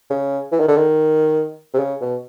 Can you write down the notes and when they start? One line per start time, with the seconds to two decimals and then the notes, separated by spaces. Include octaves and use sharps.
0.10 C#3
0.52 E3
0.60 D#3
0.68 D3
0.76 D#3
1.74 C3
1.79 C#3
2.01 B2